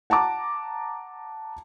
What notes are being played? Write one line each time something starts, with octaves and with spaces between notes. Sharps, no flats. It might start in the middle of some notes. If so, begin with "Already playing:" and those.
F#5 A5 A#5 D6